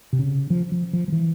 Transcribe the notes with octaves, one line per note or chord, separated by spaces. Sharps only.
C3
C#3
F3
F3
F3
F3
E3